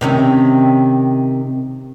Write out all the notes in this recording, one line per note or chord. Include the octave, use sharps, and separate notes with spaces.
C3 D#3 C#4